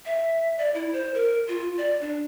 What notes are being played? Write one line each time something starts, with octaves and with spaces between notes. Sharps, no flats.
E5
D5
E4
C5
A#4
F4
D5
D4